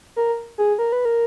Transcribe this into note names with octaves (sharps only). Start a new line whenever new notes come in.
A#4
G#4
A#4
B4
A#4